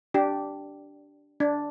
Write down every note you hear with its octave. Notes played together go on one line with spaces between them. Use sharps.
D4 G4
D4